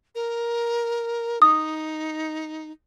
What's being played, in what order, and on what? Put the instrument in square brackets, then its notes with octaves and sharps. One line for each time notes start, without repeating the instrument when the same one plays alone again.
[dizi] A#4
[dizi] D#4 [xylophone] D#6